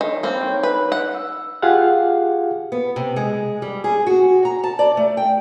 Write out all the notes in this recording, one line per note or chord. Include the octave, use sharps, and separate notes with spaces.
D#3 A4 A#4 C#5
A#3 C4 B5
D#4 C#5
B4
F#5
E6
F4 G4 G#4 F5 F#5
B3
C3
G#3
G3
G#4
F#4
A#5
A5
D5
A3
G5